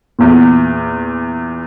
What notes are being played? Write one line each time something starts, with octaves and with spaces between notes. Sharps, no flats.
E2 A#2